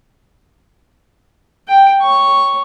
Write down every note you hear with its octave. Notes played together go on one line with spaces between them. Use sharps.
G5
C#5 C#6